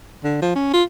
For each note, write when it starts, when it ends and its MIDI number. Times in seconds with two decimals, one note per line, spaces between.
0.24 0.39 50
0.42 0.54 53
0.55 0.73 61
0.73 0.83 65